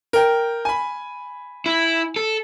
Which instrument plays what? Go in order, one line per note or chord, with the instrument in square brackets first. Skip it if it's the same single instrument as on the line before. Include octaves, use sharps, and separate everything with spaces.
[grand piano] A#4 G5
G#5 B5
[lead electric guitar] E4
A4